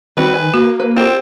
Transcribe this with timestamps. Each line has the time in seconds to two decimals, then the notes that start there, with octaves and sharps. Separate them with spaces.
0.17 D#3 G3 C4 F#4 B4
0.34 G#5
0.54 A#3 F#4
0.80 B4
0.96 C4 F4 G4